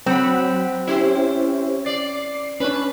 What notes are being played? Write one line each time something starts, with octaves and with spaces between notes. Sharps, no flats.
F#3 C4 F#5 B5
C#4 E4 G4 C5
D5 C7
C#4 D4 B4